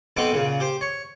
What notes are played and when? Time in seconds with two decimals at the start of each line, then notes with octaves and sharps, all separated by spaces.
0.17 B1 B2 B3 C4 G5 D6
0.33 A#2 C#3
0.60 G4 C5
0.81 C#5